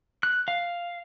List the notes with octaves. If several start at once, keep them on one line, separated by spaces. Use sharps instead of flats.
F#6
F5